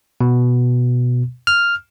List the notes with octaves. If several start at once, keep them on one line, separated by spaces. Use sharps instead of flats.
B2
F6